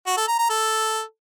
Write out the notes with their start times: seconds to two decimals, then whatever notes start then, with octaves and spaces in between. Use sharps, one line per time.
0.06 F#4
0.17 A4
0.28 A#5
0.39 A#5
0.50 A4